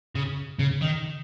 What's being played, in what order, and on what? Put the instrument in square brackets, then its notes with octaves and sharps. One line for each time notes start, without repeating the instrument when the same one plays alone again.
[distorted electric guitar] C#3
C#3
D#3